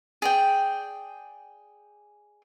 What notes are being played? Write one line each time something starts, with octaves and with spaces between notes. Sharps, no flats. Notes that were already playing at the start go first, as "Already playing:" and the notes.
G#4 D5 G5